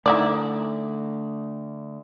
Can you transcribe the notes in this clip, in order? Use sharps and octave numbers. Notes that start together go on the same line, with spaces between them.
D3 A3 D#4 E4 D5